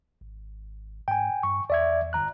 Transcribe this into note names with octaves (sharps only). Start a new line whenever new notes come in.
G#1
G#2 G5 G#5
G2 C#6
E2 D5 E5 G#6
G1 A#5 F#6